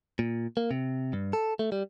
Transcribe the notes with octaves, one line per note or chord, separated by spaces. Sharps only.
A#2
A#3
C3
G2
A4
A3
G3